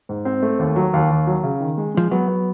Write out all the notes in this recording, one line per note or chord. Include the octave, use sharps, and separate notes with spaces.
G#2
C4
A3
D#2
F#3
D#2
D#2
F#3
C#3
D#3
G#3
F3 G#3
F#3 B3
B3